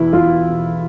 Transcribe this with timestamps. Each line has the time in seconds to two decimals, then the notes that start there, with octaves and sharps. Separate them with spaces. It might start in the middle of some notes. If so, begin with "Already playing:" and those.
Already playing: E2 B2 E4
0.13 E2 F4
0.48 B2